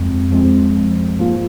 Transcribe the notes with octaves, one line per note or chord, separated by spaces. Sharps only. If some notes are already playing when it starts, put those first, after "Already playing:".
Already playing: F2 F3 G#3 C4
F2 F3 G#3 C4
G#2 F3 A#3 F4